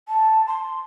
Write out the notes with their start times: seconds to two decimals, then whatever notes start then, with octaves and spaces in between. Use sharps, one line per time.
0.08 A5
0.47 C6